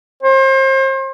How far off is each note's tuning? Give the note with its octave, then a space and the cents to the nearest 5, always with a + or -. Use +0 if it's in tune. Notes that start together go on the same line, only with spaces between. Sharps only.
C5 +35